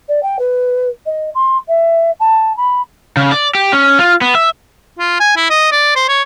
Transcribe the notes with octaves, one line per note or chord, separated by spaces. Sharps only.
D5
G5
B4
D#5
C6
E5
A5
B5
C#3
D5
G4
C#4
F4
B3
E5
F4
G#5
E4
D#5
D5
C5
C#5